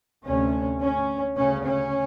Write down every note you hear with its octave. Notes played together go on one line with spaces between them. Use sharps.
D2 C3 C#4
C#4
D2 C#3 C#4
C#4